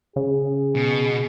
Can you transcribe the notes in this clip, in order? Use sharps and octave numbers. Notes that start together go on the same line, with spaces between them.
C#3 G#4
B2